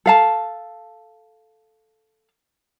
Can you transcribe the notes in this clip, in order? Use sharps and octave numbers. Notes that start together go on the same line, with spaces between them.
A4 F5 A5